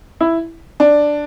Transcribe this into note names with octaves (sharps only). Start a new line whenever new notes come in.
E4
D4